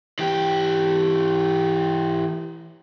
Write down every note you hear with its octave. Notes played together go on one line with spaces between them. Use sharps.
E3 G4